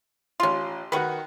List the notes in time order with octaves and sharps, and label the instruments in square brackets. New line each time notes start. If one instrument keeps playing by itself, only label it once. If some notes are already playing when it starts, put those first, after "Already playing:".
[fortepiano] A1 C6 [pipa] C#4 F4
[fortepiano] D#3 F#4 [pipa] B4 F#5 C#6